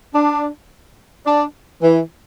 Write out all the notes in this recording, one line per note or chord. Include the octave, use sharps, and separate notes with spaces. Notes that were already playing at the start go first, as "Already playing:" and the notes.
D4
D4
E3